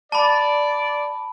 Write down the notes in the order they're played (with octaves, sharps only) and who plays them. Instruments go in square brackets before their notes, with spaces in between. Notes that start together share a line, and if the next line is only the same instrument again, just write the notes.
[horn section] D5 [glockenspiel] A5 B5